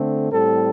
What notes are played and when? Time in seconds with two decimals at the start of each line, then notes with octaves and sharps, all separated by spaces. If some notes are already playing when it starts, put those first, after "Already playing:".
Already playing: D3 A3 C4
0.31 A2 G3 C4 A4